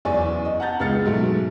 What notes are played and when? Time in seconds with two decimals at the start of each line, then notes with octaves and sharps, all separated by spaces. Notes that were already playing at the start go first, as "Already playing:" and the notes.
0.05 F#1 E2 D5 G#5 C#6
0.45 D#5
0.60 F#5 A5 A#5 G6 A6
0.80 C#2 G#3 B3 F6 A6 C#7
1.05 G#2 B2 F#3 A3